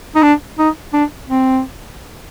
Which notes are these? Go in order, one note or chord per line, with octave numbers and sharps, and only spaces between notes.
D#4
D4
D#4
D4
C4